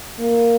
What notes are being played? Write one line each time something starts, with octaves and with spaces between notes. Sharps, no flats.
A#3